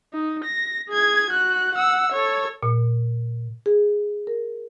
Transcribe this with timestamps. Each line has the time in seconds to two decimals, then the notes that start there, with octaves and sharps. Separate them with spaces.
0.13 D#4
0.44 A#6
0.89 G#4 G#6
1.30 F#4 F#6
1.75 F#5 E6
2.12 A4 C#5
2.63 A#2
3.66 G#4
4.27 A#4